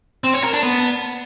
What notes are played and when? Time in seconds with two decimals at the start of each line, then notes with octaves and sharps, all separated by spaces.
0.24 C4
0.34 C#5
0.43 A#4
0.53 D4
0.63 B3